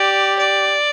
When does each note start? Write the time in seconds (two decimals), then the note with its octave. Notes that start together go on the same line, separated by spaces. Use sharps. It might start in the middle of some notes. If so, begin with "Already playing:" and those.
Already playing: G4 D5
0.39 D5